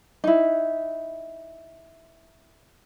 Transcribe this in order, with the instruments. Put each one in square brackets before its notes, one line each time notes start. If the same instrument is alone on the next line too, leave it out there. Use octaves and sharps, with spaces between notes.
[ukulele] D#4 E4